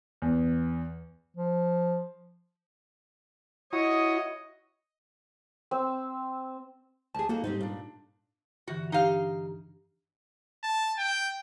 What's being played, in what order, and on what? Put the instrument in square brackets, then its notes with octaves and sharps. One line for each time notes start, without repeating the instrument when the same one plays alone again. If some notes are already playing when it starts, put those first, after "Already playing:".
[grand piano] E2
[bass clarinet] F3
[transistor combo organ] E4 F#4 D#6 [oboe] C#5 [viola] D#5
[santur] C4 E6
[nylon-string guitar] D2 G#4 [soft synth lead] A5
[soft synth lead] A#3 [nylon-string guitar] D#4 F#4 A4
[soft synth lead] G#2 [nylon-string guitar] G3 C4 D#4
[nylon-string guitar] A#2 D4
[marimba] G2 D3 E3 [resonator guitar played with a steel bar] F#4
[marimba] D4 G4 [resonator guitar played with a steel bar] D#4 F5
[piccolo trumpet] A5
G5